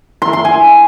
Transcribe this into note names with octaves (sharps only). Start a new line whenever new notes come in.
C6
C6
G#5